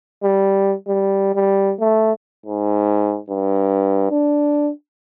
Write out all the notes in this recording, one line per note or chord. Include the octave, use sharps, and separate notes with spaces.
G3
G3
G3
A3
G#2
G2
D4